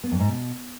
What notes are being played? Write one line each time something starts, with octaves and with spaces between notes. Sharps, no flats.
B3
F2
G#2
B2